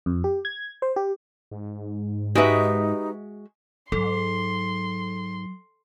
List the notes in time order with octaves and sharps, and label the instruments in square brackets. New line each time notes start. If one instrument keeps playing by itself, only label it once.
[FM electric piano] F2
G4
G#6
C5
G4
[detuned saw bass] G#2
[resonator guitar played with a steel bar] G#3 F#4 E5 [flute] D#4 [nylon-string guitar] G4 B4
[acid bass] G#2 [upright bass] F#3 [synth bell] A4 [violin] C6